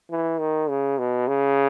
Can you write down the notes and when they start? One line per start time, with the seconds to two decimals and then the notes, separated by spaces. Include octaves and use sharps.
0.11 E3
0.40 D#3
0.69 C#3
0.98 B2
1.28 C#3